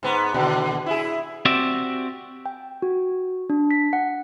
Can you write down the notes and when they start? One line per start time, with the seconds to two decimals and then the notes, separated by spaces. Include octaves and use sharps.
0.03 G#2 B3
0.34 D#2 B2 D3
0.86 E4 G#4
1.45 C4 F#4 G4 D5 E5
2.46 G5
2.82 F#4
3.50 D4
3.71 B6
3.93 F#5